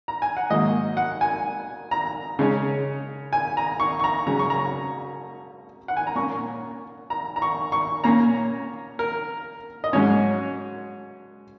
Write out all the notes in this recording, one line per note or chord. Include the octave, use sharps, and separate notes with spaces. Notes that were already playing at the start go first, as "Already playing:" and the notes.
A#5
G#5
F#5
G#2 D#3 F#3 A#3 D#5
F#5
G#5
A#5
C#3 G#3 C#4
G#5
A#5
C#6
C#6
A#5
C#3 F#3 C#4 A#5
C#6
A#5
F#5
G#5
A#5
A#2 A#3 C#4 C#6
A#5
A#5
C#6
C#6
A#2 A#3 C#4 A#5
A#4
D#5
G#2 F#3 C#4 C#5